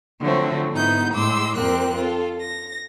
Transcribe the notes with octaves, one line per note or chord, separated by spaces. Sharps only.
D3 F3 F#3 A3 C4
G#2 B3 D#4 E4 G6
A2 G#3 C6 D6 E6
F2 C4 G4 A#4 F#6
F4 A4
A#6